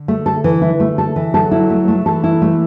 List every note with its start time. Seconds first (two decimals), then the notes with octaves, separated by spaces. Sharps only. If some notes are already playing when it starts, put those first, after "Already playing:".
Already playing: D3
0.08 A3
0.26 A4
0.44 E3
0.62 E4
0.80 A3
0.98 A4
1.16 E3
1.34 F#3 A4
1.51 E4
1.70 A3
1.88 A3
2.06 E3 A4
2.24 E4
2.42 A3